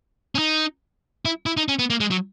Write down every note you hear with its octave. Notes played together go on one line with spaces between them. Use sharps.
C#4
D#4
E4
E4
D#4
C#4
B3
A#3
G#3
F#3